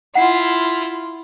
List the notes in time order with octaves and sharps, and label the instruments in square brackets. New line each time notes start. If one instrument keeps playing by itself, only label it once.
[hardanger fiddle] E4 F4 [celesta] F#5 C7